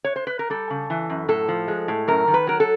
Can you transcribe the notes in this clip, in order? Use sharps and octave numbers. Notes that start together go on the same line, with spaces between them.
C#5
C5
B4
A#4
G3 A4
C#3
E3
F#2
A2 A4
F3
G#3
A2
F#2 A#4
D#3
B4
F#3 A#4
A4